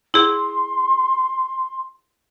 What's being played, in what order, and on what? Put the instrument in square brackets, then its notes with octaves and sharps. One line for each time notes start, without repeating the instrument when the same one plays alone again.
[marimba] E4 G#4 [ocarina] C6